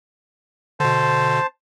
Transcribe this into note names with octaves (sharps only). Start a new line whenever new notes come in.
B2 D3 C5 A5